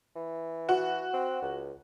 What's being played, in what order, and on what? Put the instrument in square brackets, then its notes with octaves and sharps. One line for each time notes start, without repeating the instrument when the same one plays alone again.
[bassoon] E3
[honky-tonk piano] F#4
[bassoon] C4
C#2